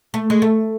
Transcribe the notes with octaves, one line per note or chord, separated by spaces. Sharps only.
A3
G#3
A3